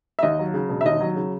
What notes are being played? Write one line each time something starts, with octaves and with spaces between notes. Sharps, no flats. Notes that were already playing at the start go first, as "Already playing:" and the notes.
E5
D#2 D#5
F#3
C#3
E1
E5
D#2 D#5
F#3
C#3